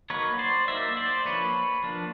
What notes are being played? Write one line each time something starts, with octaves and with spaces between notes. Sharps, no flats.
F#3 A#3 D#4 B4 C#5
C5 D5
F#3 A#3 D#4 D5 E5
C5 D5
F3 A#3 D4 B4 C#5
F3 A#3 D4